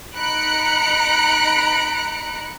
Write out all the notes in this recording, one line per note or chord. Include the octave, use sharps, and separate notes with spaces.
D#4 A#5 B5 F#6 C#7 D7